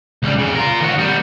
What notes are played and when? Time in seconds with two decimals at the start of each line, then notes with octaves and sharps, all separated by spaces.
0.23 C#2 G3
0.39 F2 C#3
0.56 F4 A#4
0.80 D#3 F#4
0.99 G3 B3